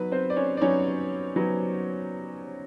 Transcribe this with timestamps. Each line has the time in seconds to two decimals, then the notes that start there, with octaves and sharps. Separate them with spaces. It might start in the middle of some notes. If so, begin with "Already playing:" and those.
Already playing: F#3 B3 D#4 B4
0.12 C4 C5
0.30 D5
0.36 C#4 C#5
0.57 D5
0.61 F#3 B3 C#4 D#4 C#5
1.36 F#3 B3 D#4